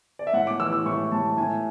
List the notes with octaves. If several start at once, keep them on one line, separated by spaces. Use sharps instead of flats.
D5
E5
A2 F#5
D6
E3 E6
E6
A2 C#6
A2 A5
A2 G#5